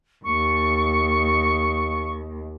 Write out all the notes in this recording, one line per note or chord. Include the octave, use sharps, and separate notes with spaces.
D#2 C#6